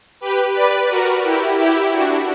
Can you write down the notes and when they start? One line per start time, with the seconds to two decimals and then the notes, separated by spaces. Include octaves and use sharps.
0.21 G4 B4
0.55 B4 D5
0.89 F#4 A#4
1.24 E4 G4
1.58 E4 G4
1.92 D4 F#4